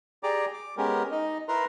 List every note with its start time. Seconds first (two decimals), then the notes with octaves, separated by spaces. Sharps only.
0.23 G4 G#4 D5 A#5 D6
0.53 D6
0.77 G#3 B3 C#4 G4 A#4
1.12 D#4 D#5
1.48 E4 A#4 B4 A#5 C6